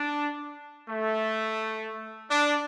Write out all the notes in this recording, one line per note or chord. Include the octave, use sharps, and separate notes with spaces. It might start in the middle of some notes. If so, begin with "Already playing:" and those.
Already playing: D4
A3
D4